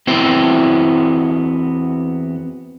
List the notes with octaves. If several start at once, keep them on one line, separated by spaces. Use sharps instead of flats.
E2 B3 C4 E4 F#4 G5